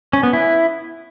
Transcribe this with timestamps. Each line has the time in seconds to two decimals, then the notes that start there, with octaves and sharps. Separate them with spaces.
0.13 C#4
0.23 B3
0.33 E4